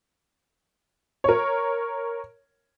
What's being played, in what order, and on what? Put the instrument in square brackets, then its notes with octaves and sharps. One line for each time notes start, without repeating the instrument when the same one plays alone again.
[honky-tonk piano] A#4 C#5